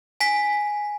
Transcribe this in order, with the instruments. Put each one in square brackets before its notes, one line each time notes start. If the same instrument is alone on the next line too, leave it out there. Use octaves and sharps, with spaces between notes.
[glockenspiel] G#5 B6